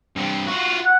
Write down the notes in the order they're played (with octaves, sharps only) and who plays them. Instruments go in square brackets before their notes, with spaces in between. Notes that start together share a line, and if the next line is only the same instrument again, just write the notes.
[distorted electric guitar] G2 C4
F4 F#4
[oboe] F#5